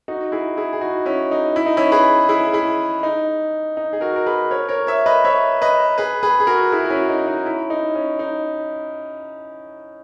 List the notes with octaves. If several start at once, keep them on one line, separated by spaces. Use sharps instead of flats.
D#4 F#4
E4 G#4
E4 G#4
G#4
D#4 F#4
C#4 E4
D#4
E4
D#4
C#4 E4
G#4 B4
E4 G#4
E4 G#4
D#4
D#4
G#4
F#4 A#4
A#4
G#4 B4
A#4 C#5
A#4 C#5
C#5 E5
B4 D#5
C#5 E5
B4 D#5
G#4 B4
G#4 B4
G#4
F#4 A#4
E4 G#4
F#4
C#4 E4
D#4
D#4
C#4 E4
D#4
C#4
D#4